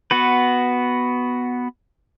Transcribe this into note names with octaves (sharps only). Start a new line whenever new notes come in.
B3 F#4 B4